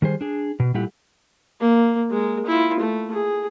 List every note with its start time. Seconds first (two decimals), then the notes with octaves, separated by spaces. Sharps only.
0.02 D#3 G3 G#4 C5
0.21 D4 G#4
0.60 B2
0.74 A#2 G3 A3 E4 G4 F#5
1.60 A#3
2.10 G#3 A#4
2.46 E4 F4
2.80 A3
3.13 G#4